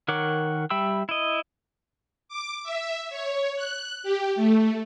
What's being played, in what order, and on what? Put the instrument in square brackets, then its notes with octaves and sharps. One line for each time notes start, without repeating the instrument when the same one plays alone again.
[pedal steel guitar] D#3 A#4 C#5 F#5 D6
G3 E5 G5 B5 E6
E4 D#5
[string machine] D6
E5
C#5
F#6
G4
A3